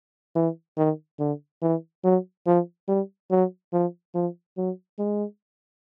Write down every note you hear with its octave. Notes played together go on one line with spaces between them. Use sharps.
E3
D#3
D3
E3
F#3
F3
G3
F#3
F3
F3
F#3
G#3